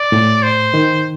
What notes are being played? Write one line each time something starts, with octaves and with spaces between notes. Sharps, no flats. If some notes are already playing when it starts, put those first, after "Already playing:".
Already playing: D5
A2
C5
D#3